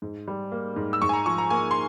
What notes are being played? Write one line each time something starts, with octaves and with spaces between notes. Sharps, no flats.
G#2
G3
A#3
G#2
E6
G#2 C#6
G#5
A#5
F3 C#6
A#5
A#3 G#5
C6